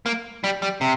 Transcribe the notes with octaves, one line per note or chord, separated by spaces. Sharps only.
A#3
G3
G3
C3